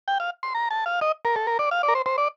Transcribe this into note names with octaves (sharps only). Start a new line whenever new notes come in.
G5
F5
C6
A#5
A5
F5
D#5
A#4
A4
A#4
D5
F5
D5
A#4
C5
C5
D5